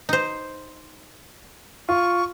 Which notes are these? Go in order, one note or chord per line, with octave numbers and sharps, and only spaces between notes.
D#4 C5
F4 C#6